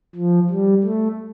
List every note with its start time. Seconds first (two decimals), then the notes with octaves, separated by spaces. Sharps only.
0.15 F3
0.50 G3
0.84 A3